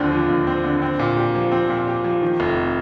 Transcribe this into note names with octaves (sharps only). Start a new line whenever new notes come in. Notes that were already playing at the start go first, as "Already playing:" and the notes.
Already playing: D#2 D3 F3 C4
F3
D#2
C4
D3
C4
A#2
G4
F3
C4
A#2
G4
F3
D#3
F1